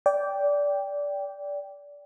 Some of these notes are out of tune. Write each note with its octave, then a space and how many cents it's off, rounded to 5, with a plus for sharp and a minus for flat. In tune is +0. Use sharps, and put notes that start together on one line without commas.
D5 -20 G5 +0